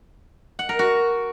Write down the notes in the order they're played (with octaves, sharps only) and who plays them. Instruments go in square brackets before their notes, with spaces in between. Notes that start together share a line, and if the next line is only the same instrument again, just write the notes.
[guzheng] F#5
A#4
F#4